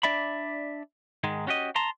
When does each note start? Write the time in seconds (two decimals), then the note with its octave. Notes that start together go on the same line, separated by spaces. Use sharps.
0.03 D4 D5 E5 B5
1.24 G#2 D#3 G#3
1.47 C#4 F#4 G4 D#5
1.76 A5 A#5 C6